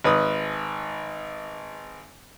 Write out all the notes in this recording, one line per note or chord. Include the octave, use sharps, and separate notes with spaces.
G#1 B4 D#6